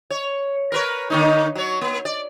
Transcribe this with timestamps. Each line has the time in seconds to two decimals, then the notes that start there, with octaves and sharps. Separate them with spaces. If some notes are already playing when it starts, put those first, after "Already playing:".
0.10 C#5
0.72 A#4 B4 C#5
1.10 D3 A#3 D#4
1.55 F#3 C#5
1.81 A#3
2.05 D5